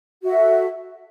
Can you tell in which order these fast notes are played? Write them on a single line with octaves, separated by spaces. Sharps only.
F#4 E5 A4